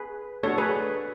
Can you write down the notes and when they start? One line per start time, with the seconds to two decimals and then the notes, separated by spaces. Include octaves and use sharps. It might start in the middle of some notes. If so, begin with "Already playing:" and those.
Already playing: G#4 B4
0.43 A3 D4 F#4 A4 C#5
0.58 G#4 B4